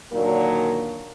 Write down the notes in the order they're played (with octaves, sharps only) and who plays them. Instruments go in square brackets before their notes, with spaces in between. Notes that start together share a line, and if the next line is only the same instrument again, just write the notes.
[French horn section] A#2 D3 D#3 F#3 A#3